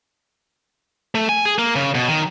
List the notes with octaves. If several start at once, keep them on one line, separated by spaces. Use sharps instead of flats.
A3
G#5
G#4
A#3
C#3
B2
D#3